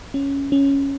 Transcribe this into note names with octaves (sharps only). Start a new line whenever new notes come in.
C#4
C#4